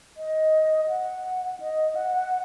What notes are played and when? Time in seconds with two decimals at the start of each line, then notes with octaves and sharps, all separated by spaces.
0.17 D#5
0.88 F#5
1.60 D#5
1.95 F#5